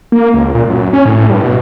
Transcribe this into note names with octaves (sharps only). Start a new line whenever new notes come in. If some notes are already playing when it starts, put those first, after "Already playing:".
A#3
C#2
A#2
F#2
C#4
A2
G2
B2